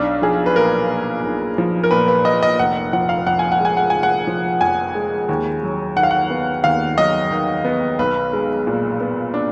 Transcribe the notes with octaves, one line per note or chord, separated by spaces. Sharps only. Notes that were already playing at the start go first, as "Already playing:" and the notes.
Already playing: B1 D4
F3 G#4
B4
A#2 A#4
A#3
B1
F3
A#4
A#2 B4
B4
A#3 D#5
D#5
F1 F#5
F3 F#5
F5
F2 F#5
G#5
F#5
G#3 G#5
F#5
F1 G#5
F#5
F3
F2 G#5
G#3
D#2
F#3
D#3 F#5
F5
F#5
B3
D#2 F5
F#3 D#5
D#3
B3
B1 B4
G#3
A#2
B3
D4